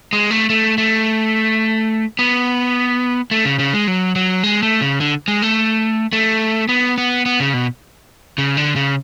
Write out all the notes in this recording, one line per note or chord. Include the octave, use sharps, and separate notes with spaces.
G#3
A3
A3
A3
B3
A3
C#3
C#3
G#3
F#3
F#3
G#3
A3
C#3
D3
G#3
A3
A3
B3
B3
B3
C#3
B2
C#3
D3
C#3